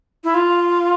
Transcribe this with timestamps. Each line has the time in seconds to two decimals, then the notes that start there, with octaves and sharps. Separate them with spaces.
0.24 E4
0.34 F4